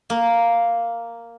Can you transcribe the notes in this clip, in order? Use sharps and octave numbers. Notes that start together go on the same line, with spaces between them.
A#3